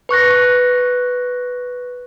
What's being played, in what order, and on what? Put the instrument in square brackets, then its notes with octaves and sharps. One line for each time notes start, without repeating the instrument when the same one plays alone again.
[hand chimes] B4 C#6 F#6 A#6